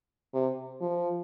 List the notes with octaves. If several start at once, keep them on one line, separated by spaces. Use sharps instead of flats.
C3
F3